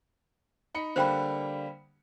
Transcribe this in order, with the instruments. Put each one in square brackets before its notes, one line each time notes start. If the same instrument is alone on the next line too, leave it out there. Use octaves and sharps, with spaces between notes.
[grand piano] D#4 B5 C#7
[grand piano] D3 G3 A#3 [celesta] C5 G5 B5